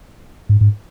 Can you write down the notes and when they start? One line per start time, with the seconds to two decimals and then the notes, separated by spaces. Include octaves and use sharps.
0.49 G#2
0.61 G#2